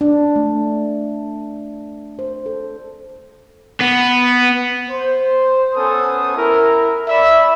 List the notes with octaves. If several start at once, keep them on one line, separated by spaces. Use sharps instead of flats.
D4
A3
C5
A4
B3
C5
B3 C#4 A4 C5 G#5 D#6
E4 A#4
D5 E5 B5